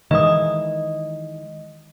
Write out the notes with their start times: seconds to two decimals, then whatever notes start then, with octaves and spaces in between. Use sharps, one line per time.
0.11 D#3 E3 G#3 D#5 D#6